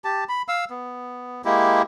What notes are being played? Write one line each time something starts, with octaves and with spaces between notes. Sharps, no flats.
G4 A5
B5
F5 E6
B3
G#3 A#3 E4 G4